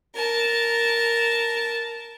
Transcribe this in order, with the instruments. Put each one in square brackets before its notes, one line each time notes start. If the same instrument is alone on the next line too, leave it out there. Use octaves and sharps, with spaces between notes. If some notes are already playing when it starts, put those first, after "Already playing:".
[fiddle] A#4 A5